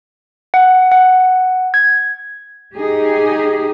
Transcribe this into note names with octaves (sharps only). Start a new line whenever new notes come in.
F#5
F#5
G#6
D#4 G4 G#4